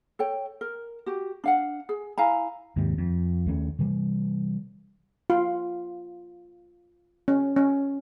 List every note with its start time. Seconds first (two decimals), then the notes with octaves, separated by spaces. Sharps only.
0.19 A4 C#5 G5
0.61 A#4
1.06 F#4 G4
1.44 D4 F5 F#5
1.89 G#4
2.18 E4 F5 G#5 A#5
2.76 D#2 G#2 C3
2.98 F2
3.46 D#2 A3 A#3 C#4
3.79 C3 E3 G3
5.30 F4
7.28 C#4
7.56 C#4